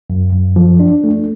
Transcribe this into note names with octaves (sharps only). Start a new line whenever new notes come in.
F#2
F#2
F3
D4
A3